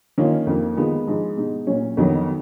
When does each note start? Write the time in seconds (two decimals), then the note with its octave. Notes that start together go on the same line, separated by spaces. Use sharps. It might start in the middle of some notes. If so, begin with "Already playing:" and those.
0.18 D#3 A#3 C#4 F4
0.47 F2 F3 A#3
0.77 D#3 G#3 B3 F4
1.07 G#2 F3 G#3 B3 D#4
1.37 B2 G#3 D#4
1.67 A#2 F#3 C#4
1.97 F2 D#3 F#3 B3